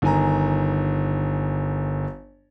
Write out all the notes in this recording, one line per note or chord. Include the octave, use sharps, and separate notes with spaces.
G1 D#3 G#5 A#5